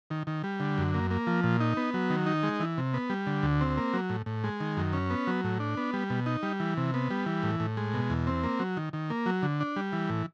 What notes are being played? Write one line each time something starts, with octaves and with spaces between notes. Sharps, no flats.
D#3
D#3
G3
D3
F#2
A#3
A#3
F3
A#2
D#4
B3
F#3
D#3
D#4
G#3
E3
C3
B3
G3
D3
D2
C4
A#3
F#3
A2
A2
G#3
D#3
F#2
C#4
B3
F#3
A2
D4
B3
G3
B2
D#4
G3
E3
C3
B3
G3
E3
A2
A2
G#3
B2
E2
C4
A#3
F#3
D#3
D#3
A#3
F#3
D3
D4
G3
E3
A2